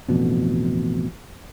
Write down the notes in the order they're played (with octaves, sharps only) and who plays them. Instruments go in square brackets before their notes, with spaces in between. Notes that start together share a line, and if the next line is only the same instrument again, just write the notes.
[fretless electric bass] A1 F2 B2 D3